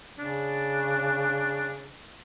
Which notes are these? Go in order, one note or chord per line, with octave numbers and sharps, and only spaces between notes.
C#3 D4